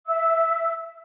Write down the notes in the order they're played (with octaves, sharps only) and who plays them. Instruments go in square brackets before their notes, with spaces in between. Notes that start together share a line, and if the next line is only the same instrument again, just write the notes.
[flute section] E5 E6